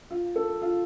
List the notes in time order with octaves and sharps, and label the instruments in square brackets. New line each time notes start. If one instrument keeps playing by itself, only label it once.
[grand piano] F4
A4
F4